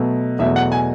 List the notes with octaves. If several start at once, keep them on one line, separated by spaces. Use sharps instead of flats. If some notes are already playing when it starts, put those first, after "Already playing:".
Already playing: B2 F#3 A3
E2 B2 F#3 A3 E5
F#5
G#5